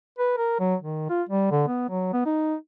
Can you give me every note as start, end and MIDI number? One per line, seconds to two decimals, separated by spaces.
0.19 0.34 71
0.37 0.56 70
0.60 0.75 54
0.82 1.05 51
1.10 1.22 65
1.29 1.50 55
1.51 1.63 50
1.67 1.85 59
1.90 2.11 54
2.13 2.22 59
2.26 2.55 63